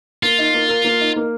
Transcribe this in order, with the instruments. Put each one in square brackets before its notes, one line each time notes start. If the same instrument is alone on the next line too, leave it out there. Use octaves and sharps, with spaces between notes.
[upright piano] A#3 [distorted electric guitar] F4
[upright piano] D#4
A#3
A#4
A#3
D#4
A#3